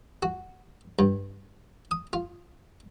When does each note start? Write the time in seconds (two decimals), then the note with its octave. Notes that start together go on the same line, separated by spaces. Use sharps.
0.23 F#4
0.99 G2
1.91 D#6
2.13 F4